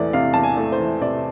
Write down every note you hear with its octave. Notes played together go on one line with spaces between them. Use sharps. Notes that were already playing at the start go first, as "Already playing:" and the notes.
Already playing: E2 C3 E3 A3 D5
C3 F5
E2 A5
G#5
A3
C5
E3
C3 D5